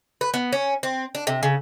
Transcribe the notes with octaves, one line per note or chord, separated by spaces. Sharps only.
B4
B3
C#4
C4
D4
C3
C#3